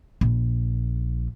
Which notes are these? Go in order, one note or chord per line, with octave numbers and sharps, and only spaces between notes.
A#1